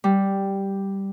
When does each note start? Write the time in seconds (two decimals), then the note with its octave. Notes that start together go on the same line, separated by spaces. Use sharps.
0.04 G3